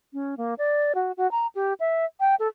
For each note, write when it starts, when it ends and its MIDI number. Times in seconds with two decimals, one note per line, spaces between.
0.13 0.35 61
0.38 0.54 58
0.58 0.93 74
0.95 1.12 66
1.17 1.30 66
1.31 1.47 82
1.55 1.73 67
1.80 2.05 76
2.20 2.35 79
2.40 2.48 69